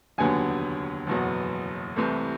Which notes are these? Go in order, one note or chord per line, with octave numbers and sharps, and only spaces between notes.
F1 D#2 D3 F#3 B3 G#5
F#1 E2 B2 F#3 B3
C2 C3 E3 A3